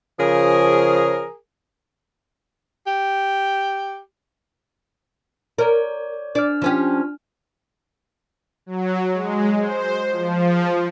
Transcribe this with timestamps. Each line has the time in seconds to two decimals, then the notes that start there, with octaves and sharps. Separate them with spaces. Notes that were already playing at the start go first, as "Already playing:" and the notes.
0.19 C#3 F3 G#4 A#4
2.87 G4
5.58 A#4 C#5 D5
6.35 D4 D5 F6
6.62 F3 C#4 G4
8.66 F#3
9.13 G#3
9.59 C5
10.11 F3